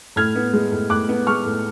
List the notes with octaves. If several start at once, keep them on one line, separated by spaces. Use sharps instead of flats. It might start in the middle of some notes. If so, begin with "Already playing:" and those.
A2 F6 G#6
B3
G#3
A2
A2 D6 F#6
B3
G#3 C#6 F6
A2